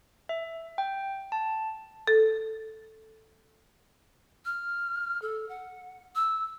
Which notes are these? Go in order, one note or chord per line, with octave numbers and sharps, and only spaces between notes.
E5
G5
A5
A4
F6
A4
F#5
E6